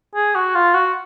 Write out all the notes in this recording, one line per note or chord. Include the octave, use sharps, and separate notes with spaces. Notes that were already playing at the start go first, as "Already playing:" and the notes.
G#4
F#4
F4
F#4